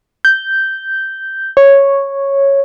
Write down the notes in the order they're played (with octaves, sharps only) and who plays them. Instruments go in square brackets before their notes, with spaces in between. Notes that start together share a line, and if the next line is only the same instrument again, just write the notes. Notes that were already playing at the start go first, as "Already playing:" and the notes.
[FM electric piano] G6
C#5